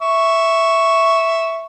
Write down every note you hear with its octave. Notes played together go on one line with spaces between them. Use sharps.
E5 C#6